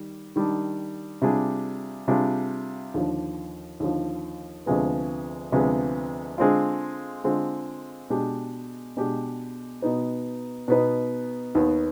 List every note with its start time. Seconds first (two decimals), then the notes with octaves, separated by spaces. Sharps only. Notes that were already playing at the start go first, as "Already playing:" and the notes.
Already playing: D#3 G3
0.36 D#3 G3 D4
1.22 C3 G3 D4 F4 G#4
2.08 C3 G3 D4 F4 G#4
2.94 D#2 D3 F3
3.80 D#2 D3 F3
4.66 D2 C3 F3 G#3 B3
5.52 D2 C3 F3 G#3 B3
6.38 D3 G#3 C4 F4
7.24 D3 G#3 C4 F4
8.10 B2 G#3 D4 G4
8.97 B2 G#3 D4 G4
9.82 B2 B3 D#4 B4
10.68 B2 B3 D#4 B4
11.55 D#2 D#3 B3